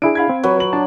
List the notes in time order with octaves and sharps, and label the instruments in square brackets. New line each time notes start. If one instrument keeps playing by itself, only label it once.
[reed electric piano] D4 E4 G#4 [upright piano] D7
[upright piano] F5 B5 G#6
[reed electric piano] C4
[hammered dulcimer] F#3 [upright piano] B4
[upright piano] B4 F#7
[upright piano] D4 [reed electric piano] A5